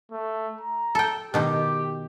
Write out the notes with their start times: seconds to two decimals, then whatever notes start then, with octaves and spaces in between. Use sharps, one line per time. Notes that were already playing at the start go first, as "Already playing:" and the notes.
0.12 A3
0.61 A#5
0.95 A4 G5
1.34 B2 D#3 D#4 G4